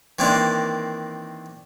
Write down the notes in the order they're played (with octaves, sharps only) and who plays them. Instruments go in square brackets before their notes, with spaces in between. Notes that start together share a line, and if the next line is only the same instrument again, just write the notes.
[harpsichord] D#3 E3 A#3 C4 D4